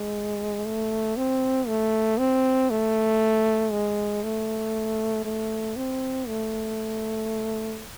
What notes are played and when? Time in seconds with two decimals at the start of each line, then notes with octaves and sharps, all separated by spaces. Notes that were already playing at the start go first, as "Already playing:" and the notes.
Already playing: G#3
0.65 A3
1.16 C4
1.67 A3
2.18 C4
2.70 A3
3.72 G#3
4.23 A3
5.25 A3
5.76 C4
6.27 A3